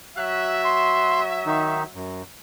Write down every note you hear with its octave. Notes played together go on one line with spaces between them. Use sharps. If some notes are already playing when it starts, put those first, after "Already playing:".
F#3 F#4 E5 F#6
C6
D#3 D#4
F#2